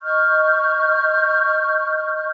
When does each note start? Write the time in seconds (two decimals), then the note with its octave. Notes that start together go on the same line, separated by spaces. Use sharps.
0.01 D#5 C#6 F6 G6